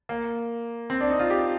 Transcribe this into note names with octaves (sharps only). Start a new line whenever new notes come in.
A#3
C4
D4
D#4
F4
G4